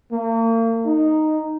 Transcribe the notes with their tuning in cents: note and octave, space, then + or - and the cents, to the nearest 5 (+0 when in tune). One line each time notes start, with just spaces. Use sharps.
A#3 -40
D#4 -5